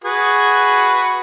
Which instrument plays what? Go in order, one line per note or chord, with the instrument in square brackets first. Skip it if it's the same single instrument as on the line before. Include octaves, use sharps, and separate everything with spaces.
[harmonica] F#4 G#4 B4